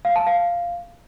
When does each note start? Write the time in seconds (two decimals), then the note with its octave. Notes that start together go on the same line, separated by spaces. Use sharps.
0.05 F5
0.16 A5
0.27 F5